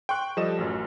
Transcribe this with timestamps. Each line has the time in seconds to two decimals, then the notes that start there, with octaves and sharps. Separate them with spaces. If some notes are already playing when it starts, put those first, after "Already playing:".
0.09 G5 C6 C#6 F#6
0.37 F3 G3 A4 D#5 E7
0.58 A1 F#2